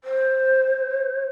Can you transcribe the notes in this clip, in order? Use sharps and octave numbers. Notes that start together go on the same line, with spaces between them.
C5